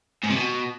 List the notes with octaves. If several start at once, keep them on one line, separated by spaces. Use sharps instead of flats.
G#2
C3
B2